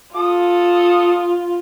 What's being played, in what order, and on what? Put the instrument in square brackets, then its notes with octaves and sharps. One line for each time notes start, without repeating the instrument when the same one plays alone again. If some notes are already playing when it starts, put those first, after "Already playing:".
[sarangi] F4 [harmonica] A4 D#6